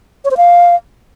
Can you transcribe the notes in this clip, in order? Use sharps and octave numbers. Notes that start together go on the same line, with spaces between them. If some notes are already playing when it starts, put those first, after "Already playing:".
C#5
C5
F5